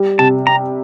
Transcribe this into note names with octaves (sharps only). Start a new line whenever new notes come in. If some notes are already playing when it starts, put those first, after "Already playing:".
Already playing: G3
C3 A5
G4 A#5